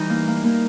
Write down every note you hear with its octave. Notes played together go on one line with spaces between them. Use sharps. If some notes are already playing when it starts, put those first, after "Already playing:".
Already playing: E3 G3 D#4
A#3
A#3
A#3